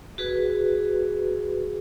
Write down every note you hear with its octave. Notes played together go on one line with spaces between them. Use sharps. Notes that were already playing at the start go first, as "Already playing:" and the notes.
F#4 G#4 B4